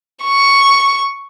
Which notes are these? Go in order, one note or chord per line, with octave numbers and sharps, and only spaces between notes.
C#6